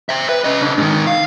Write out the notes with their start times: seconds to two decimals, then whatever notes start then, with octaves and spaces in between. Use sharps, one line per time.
0.09 C5 E5
0.29 B4
0.44 C#4 D#5
0.61 C#3 D4
0.77 G#2 D#3
1.07 F5